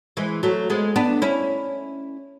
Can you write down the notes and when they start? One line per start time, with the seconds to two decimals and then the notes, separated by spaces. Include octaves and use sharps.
0.17 E3 G#3
0.43 F#3 A3
0.70 G#3 B3
0.96 B3 D4
1.22 C#4 E4